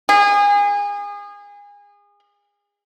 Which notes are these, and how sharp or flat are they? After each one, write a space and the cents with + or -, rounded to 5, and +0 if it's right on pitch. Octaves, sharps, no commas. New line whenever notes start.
G#4 -30